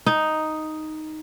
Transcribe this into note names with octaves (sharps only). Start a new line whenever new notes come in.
D#4